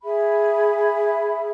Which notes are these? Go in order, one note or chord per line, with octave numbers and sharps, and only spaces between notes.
G#4 E5 B5